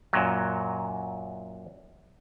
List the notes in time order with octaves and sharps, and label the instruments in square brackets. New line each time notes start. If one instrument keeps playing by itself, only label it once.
[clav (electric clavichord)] F#2 A#2 F#3